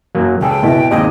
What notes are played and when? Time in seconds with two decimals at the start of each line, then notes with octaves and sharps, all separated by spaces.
0.15 F#2 F#3 A#3
0.41 C#2 G#4 A4 G5
0.63 B2 E4
0.91 D#2 C3 G#3 D#4 D#5